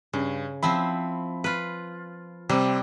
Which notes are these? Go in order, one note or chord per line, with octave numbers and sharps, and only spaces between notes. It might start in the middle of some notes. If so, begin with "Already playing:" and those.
G2 C#3
F3 C4 E4 B5
F4 B4
C3 G3 C4